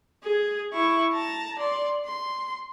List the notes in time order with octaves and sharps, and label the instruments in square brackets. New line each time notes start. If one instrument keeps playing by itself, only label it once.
[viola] G#4
E4 C#6
A5 A#5
D5 C6
C6